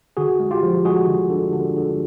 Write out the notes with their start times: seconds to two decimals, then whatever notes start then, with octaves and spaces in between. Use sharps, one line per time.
0.17 D3 F#4 G#4
0.40 G#3
0.51 F4 G4
0.63 F3
0.85 G#3 F#4 G#4
1.07 D3
1.30 D3
1.53 D3
1.76 D3